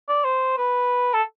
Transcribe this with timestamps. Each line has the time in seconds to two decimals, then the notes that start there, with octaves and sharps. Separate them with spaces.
0.09 D5
0.24 C5
0.57 B4
1.14 A4